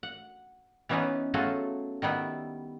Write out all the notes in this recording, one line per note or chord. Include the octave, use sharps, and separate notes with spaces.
F#5
E3 B3 C#4 D#4 E4 B4
F#3 A3 F4 F#4 G#4 A4
D#3 G3 B3 E4